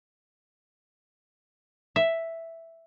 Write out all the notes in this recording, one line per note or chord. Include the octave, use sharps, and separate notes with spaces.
E5